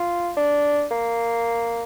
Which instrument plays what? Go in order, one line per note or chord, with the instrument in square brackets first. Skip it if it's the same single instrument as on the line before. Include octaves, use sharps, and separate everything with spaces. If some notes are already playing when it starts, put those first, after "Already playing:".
Already playing: [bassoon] F4
D4
A#3